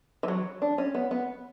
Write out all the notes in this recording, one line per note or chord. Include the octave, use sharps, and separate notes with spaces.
E3
F#3
D4
C#4
B3
B3